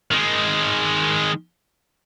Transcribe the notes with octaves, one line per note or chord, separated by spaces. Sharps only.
D#3 G#3